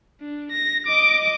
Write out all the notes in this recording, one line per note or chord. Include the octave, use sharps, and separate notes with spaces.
D4
A#6
D#5 D6